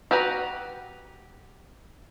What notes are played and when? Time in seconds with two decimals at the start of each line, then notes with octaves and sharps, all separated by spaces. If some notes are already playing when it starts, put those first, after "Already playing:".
0.11 F#4 G4 B4 A#5